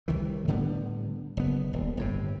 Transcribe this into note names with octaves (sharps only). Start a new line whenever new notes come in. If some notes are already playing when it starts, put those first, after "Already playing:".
C2 D#3 E3
A2 D3 G3 B3
F#1 B3
D#1
G1 A2 C3